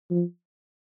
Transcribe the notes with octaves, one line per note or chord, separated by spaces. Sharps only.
F3